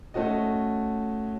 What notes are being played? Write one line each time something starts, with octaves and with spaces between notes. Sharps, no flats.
A3 C#4 F#4 D#5